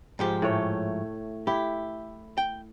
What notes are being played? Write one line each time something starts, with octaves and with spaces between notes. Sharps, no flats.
G#2 F3 G4
A2 A3 C#5
E4 G4
G5